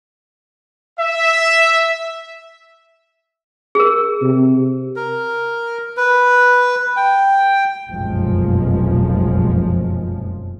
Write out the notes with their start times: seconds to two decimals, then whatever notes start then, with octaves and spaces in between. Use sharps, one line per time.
0.99 E5
3.75 G#4 A#4
4.22 C3
4.96 A#4
5.97 B4
6.96 G5
7.90 F1 B1 F#2 A#2 F3 G#3